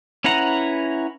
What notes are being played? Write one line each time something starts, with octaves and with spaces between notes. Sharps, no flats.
C#4 E4 B4 F#5 A#5